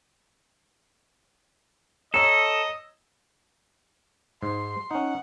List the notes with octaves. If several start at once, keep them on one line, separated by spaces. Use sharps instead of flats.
A4 C#5 D#5 A#5 E6
G#2 C6
C#4 D#4 F#5